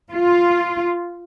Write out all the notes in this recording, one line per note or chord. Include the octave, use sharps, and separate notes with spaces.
F4